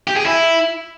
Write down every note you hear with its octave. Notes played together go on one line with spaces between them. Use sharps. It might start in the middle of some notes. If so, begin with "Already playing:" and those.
G4
G#4
E4